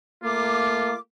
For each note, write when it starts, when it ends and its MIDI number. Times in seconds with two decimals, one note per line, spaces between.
0.23 0.93 57
0.23 0.93 58
0.23 0.95 65
0.23 0.97 86